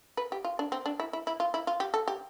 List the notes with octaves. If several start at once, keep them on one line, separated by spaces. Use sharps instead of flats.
B4
G4
F4
D4
C4
D4
E4
E4
E4
F4
E4
F4
G4
A4
G4